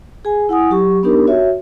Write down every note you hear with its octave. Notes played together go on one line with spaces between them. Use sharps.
G#4 G#5
E4 F#5 G#5 D#6
F#3 G4 C#6
B3 D4 D#4 G4 A#4
F#4 C#5 E5